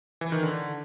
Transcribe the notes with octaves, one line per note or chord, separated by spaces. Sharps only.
E3
D#3
D3